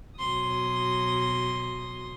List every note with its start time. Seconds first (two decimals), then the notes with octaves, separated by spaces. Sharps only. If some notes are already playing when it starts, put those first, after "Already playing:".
0.19 B2 F#3 C6 D#6